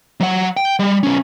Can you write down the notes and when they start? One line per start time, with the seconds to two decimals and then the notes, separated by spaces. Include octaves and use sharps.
0.20 F#3 F#5
0.57 G5
0.79 G3
1.03 B1 C#4